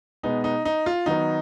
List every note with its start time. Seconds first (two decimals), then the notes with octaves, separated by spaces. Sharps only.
0.23 B2 G#3 B3 D#4
0.44 D#4
0.65 D#4
0.86 F4
1.06 D#3 F#3 B3 D#4